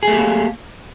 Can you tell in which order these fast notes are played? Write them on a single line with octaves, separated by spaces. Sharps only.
G#4 A3 G4 A#3